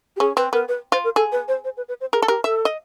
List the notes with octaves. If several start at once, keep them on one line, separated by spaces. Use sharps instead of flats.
G4
C#4 G#4
C4 B4
B3 A#4
B4
F4 C5
A#4
G#4 A4
B4
C5
C5
B4
B4
C5
G#4 A#4
A4
G4 A#4
A4 E5
D#5